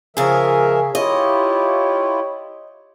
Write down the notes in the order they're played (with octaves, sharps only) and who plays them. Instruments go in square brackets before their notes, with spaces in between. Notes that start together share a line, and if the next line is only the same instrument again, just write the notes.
[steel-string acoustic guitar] C#3 G#4 [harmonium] F3 A#4 E5
[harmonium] E4 F4 [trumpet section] G4 C#5 [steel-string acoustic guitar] D#5